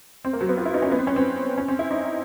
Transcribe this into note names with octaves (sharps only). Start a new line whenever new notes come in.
C4
A#3
F#3
B3
F4
E4
D#4
C#4
B3
C4
C#4
C4
C#4
C4
E4
D#4